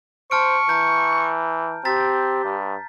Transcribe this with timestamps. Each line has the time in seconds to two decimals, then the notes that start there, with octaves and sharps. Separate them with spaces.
0.31 C5 A5 C#6 F6 D7
0.69 E3 A#5 G6
1.85 C4 G4 A#5 A6 B6
2.45 G2